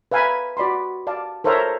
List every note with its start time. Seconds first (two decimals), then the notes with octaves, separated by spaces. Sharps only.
0.11 B4 E5 F5 G#5 A#5 B5
0.57 F#4 D5 B5 C6
1.07 D5 F5 A5
1.44 A4 A#4 C5 C#5 E5 A#5